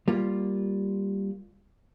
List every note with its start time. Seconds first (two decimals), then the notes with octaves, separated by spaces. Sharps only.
0.08 G3 A#3 F4